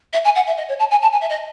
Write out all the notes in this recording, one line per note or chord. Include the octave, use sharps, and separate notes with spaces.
E5
G#5
F#5
E5
D#5
C#5
A5
G#5
A5
G#5
E5
D#5